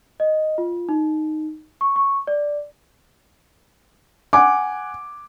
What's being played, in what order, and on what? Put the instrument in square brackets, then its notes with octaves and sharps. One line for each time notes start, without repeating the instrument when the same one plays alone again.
[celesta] D#5
F4
D#4
C#6
C#6
D5
[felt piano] F#5 G#5 D6